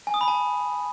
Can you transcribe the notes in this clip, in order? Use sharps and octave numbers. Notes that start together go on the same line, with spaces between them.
G#5
D#6
B5
A5